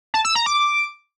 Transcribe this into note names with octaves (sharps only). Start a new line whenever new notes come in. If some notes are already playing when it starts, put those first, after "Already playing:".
A5
E6
A#5
D6